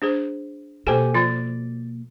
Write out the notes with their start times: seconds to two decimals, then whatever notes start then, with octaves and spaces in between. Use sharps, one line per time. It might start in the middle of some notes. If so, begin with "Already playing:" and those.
0.02 D4 G#4 C5
0.87 B2 A#3 G4 A4 C5 G#5
1.14 F3 F4 D5